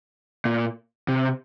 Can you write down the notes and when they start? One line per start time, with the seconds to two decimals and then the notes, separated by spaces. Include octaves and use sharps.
0.45 A#2
1.08 C3